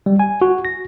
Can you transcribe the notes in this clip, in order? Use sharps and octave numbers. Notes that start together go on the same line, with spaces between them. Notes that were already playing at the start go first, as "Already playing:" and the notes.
G3
G#5
F#4
A#6